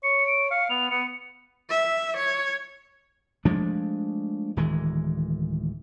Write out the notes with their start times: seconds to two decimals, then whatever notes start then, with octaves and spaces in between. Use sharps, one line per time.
0.03 C#5 C#7
0.27 D7
0.51 F5 C#7
0.70 B3 F7
0.91 B3 C#7
1.70 E5
2.17 C#5
3.45 F3 G#3 A3 D4
4.57 D1 D#3 E3 G#3